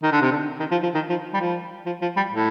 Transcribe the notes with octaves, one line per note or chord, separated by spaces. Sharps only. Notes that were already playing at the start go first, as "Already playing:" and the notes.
D#3
D3
C3
D3
D#3
F3
F3
D#3
F3
G3
F3
F3
F3
G3
A2